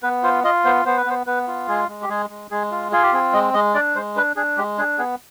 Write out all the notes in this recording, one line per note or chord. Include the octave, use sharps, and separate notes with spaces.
B3 B4
F4 C5
F4 D#5
B3 C5
B3 C5
B4
B3 C5
B3 B4
F4
G#3 G#4
G#3
G4
G#3 G#4
G#3
G#3 G#4
F4
F4 G#4
G4
C4 G#4
G#3 D#5
G#3 D#5
D4 D5
G#3 C5
D4 B4
D4 G#4
G#3 G4
D4 G#4
B3 G#4